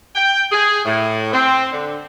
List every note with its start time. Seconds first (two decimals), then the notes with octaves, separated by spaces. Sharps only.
0.16 G5
0.51 G#4
0.85 A2
1.33 C4
1.71 D3